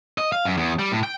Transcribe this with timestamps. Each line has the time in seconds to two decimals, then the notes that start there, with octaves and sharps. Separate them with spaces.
0.18 D#5
0.32 F5
0.45 F#2
0.57 E2
0.79 G3
0.92 A2
1.03 G5